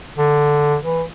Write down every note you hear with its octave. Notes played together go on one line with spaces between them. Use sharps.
D3
E3